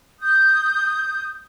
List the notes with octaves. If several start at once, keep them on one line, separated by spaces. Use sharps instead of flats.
D#6 G6